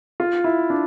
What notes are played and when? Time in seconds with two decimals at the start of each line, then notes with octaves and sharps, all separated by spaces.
0.20 F4
0.44 E4
0.70 D4